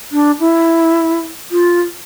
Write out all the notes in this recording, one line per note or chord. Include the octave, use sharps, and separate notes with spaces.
D4
E4
F4